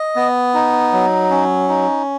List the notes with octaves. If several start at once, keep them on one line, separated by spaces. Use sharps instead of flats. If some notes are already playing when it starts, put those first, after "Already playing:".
Already playing: D#5
B3
D#4
F#3
C#4
D#4